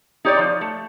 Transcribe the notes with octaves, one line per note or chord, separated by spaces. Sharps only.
D#4 G4 C#5 D5
F3
A3